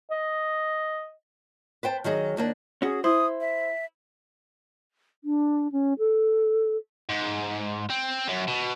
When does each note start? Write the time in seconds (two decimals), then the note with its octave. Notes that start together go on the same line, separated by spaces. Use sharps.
0.11 D#5
1.83 B4 C5 G5 A5
2.04 D#3 F#3 G#4 D#5
2.37 D#2 A#3 D4
2.82 C#4 F#4 G#4
3.04 E4 C5 D#6
3.41 E5
5.24 D4
5.72 C#4
5.99 A4
7.09 G#2
7.90 C4
8.27 F#2
8.47 B2